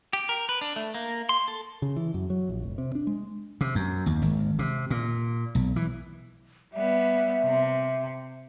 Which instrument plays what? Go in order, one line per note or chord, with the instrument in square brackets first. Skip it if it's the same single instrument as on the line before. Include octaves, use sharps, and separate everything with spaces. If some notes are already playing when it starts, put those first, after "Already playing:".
[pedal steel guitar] G4
A#4
B4
D4
A3
A#3
C6
A4
[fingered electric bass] C#3
E3
F#2
F#3
A#1
F1
C3
D4
G#3
[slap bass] C3
F#2
D#2
G#1
C3
A#2
B1
E3
[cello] G3 B3 [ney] E5
[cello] C3